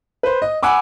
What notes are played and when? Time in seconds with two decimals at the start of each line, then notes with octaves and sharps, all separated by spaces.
0.23 B4 C5
0.42 D#5
0.63 F#5 G#5 B5 D6 E6